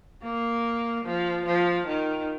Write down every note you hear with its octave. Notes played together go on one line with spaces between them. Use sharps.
A#3
F3
F3
D#3